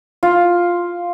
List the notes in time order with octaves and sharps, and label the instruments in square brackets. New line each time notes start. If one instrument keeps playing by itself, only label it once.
[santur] F4